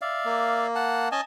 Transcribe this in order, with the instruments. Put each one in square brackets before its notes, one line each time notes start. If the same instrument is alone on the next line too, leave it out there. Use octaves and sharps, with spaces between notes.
[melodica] D5 E5 F5
[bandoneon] A#3
[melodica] F#5 A5
[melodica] C#4 [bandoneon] D#5 G#5 A5